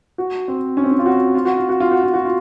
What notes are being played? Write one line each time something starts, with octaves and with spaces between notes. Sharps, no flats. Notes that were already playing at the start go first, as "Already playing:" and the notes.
F#4
C4
C#4
C4
C#4
F4
F#4
F4
F#4
F4
F#4
F4
F#4
F4
F#4
F4